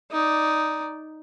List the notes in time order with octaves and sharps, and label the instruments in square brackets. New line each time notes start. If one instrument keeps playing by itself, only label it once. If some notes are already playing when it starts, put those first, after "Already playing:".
[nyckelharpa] D#4 D5